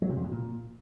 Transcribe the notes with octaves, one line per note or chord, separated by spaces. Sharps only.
F#3
C3
F2
B2
A#2